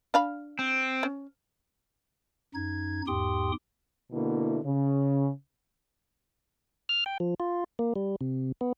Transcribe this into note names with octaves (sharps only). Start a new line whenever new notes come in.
D4 F5 B5
C4
C#4
F#2 D#4 G#6
E2 G#2 G4 G5 C6 D#6
B2 D3 A#3 E4
C#3
F6
G5
F3
F4
A#3
G3
C3
B3